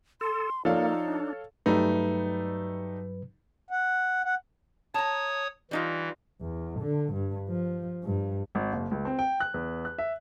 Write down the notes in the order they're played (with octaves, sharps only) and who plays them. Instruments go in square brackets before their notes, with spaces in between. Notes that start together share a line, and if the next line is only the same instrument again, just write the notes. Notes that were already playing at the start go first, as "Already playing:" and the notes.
[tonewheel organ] A4 [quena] C6
[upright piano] F3 D5 [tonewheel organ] A#3 [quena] D#4 [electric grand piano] A4 C#5 F5
[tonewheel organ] D4
[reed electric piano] G2 F#3 B4 [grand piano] G3 A3 D#4
[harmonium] F#5
F#5
[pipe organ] C#5 D#6 [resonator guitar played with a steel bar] A5 A#5
[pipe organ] E3 [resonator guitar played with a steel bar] G3 D#4 F4
[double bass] E2
D3
G2
F3
G2
[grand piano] G#1
F#1
C#2
C4
G5
F#6
E2
F#6
E5